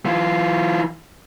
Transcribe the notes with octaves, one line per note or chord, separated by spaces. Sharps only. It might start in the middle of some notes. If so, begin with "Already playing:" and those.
E3 F4